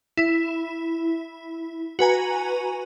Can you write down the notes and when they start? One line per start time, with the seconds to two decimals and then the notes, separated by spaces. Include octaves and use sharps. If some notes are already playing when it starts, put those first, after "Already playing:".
0.17 E4
1.99 F#4 B4 G#5 A#5